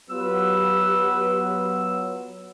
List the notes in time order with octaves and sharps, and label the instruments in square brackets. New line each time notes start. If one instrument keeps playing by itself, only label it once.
[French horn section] F#3 B3 [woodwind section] F4 E6 [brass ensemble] G4 B4